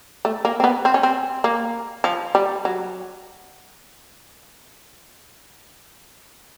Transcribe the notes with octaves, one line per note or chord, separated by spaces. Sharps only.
A3
A#3
C4
B3
C4
C#4
C4
A#3
F3
G3
F#3